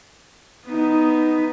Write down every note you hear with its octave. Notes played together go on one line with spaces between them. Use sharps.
B3 D#4